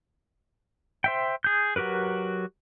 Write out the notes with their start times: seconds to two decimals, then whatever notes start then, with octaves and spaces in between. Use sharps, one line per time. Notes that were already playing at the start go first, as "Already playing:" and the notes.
1.04 C5 E5 G5
1.44 G#4 G6
1.76 F#3 F#4 G4 A#4 B4